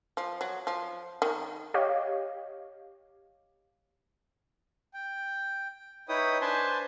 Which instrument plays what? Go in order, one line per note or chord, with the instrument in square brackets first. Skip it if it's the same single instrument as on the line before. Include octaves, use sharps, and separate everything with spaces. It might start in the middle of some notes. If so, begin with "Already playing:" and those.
[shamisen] F3
F#3
F3
D#3
[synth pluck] G4 C#5 D#5 F5
[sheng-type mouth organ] G5
D#4 E4 B4 C#5 G5 D#6
D4 B4 C5 G#5 A5 C6